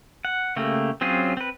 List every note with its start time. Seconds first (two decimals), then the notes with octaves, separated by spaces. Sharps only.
0.25 F#5
0.56 C#3 A3 A#3 G4
1.01 F#3 C4 C#4 F4 G#4
1.37 C4 B4